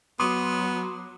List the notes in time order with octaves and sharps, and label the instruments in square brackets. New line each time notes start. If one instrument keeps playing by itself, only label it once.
[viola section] F#3 [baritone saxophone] B3 [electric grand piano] C6 D6 D#6